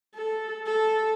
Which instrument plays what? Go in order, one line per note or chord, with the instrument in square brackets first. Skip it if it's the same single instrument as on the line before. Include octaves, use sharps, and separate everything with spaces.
[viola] A4
A4